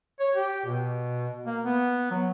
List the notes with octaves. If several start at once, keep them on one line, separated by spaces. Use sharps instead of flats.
C#5
G4
B2
A#3
B3
F#3